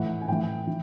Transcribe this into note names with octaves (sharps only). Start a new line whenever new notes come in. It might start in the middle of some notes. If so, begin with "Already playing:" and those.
Already playing: A2 E3 F#5
G#5
A2 E3 G5
E3